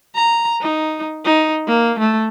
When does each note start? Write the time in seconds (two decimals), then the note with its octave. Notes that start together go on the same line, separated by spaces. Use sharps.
0.15 A#5
0.61 D#4
1.24 D#4
1.67 A#3
1.99 A3